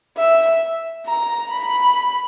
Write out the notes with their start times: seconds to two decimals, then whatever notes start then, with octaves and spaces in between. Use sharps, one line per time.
0.17 E5
1.06 A#5
1.51 B5